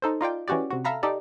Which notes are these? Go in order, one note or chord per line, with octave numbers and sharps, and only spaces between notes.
D#4 A4 C5
D#4 F4 D5 G5
E3 C#4 F#4 G4 D5
C3 F#4
A4 E5 F5 A#5 B5
D#4 G4 A4 D5